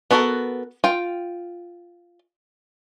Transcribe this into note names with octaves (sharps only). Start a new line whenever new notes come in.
B3 D4 F#4 A4 A#4
F4 G5